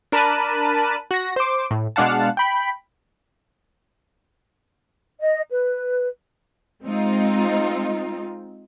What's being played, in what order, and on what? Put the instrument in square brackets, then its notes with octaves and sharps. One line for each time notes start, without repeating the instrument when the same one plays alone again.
[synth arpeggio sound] D4 A#4 A5 B5 F#6 D#7
F#4 A#6
C5 D6
A2
B2 G#3 D4 F5 F#5 A5
G5 B5 B6
[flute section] D#5
B4
[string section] G#3 C4 D#4 F4